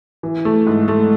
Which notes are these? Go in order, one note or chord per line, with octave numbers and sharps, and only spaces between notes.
E3
A3
G#2
A3